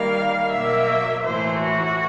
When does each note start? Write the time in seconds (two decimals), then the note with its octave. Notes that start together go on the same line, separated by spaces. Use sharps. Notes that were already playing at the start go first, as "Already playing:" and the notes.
Already playing: D#3 G3 A#3 F5
0.52 B2 F#3 A#3 E5
1.24 A2 E3 A3 C5
1.58 F#4